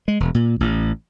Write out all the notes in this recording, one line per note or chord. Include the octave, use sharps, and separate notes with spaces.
G#3
E1
A#2
A1